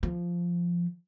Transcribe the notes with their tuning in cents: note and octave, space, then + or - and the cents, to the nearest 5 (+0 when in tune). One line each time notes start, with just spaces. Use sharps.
F3 -5